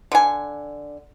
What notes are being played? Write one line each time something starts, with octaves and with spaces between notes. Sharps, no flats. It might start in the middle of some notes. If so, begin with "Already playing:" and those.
D3 G#5